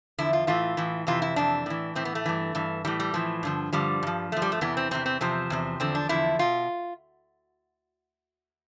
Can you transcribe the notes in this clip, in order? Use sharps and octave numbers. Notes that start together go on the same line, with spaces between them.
E2 D3 F3 E4
F4
A2 E3 F4
A2 E3
F2 C3 E3 F4
E4
F2 C3 E3 D4
A2 E3
A2 E3 C4
B3
A3
G2 E3
G2 E3
A2 E3 G3
G3
A2 E3 F3
G2 D3 F3
G2 D3 F3 G3
G2 F3
G2 F3 A3
G3
A3
E2 C3 E3 B3
C4
E2 C3 E3 C4
C4
E2 C3 F3 C4
E2 C3 F3
E2 D3 F3 C4
D4
E2 D3 F3 E4
B2 F4